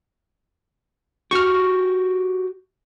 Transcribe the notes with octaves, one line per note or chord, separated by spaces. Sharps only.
F#4 G4 C#6 F6